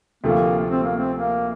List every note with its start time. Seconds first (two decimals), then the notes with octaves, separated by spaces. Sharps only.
0.24 D2 C3 F3 A3 A#3
0.70 C4
0.84 A#3
0.97 C4
1.17 A#3